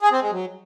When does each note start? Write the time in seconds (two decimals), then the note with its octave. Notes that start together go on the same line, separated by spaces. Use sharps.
0.02 G#4
0.12 C4
0.22 G#3
0.32 F#3